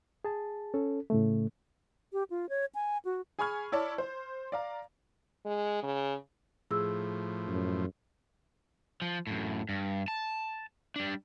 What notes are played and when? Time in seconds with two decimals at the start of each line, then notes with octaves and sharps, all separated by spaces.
0.25 G#4 A5
0.74 C#4 A4
1.10 A2 C#3 A3
2.13 G4
2.30 F4
2.49 C#5
2.75 G#5
3.05 F#4
3.39 G#4 G#5 B5 C#6 F6 G#6
3.72 E4 C#5 D5 A5
3.98 C5
4.52 D5 F5 A#5
5.45 G#3
5.83 C#3
6.71 A2 F3 G#4 E6
7.48 F#2
9.02 F3
9.27 F#2 A2
9.69 G2
10.08 A5
10.96 G3 D4